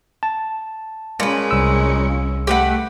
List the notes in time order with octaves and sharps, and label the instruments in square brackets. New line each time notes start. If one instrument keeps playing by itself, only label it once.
[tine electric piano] A5
[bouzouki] A#2 B4 [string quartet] G#3 C#4
[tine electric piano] C2 E6
[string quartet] A3 [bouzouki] G4 B4 F#5